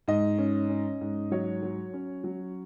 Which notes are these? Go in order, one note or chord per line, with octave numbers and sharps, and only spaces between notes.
G#2 D#5
C#4
C#4
G#2
F#3 C#5
F#3
C#4
F#3